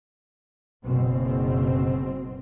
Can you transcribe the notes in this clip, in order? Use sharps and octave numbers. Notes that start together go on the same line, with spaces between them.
F#1 B2 C4